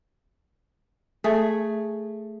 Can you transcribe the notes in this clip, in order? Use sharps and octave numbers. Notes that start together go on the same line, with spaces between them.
A3 G#4